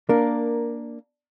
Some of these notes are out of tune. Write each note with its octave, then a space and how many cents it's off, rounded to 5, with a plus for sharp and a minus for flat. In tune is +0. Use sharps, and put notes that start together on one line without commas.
A#3 +5 D4 +0 A#4 +0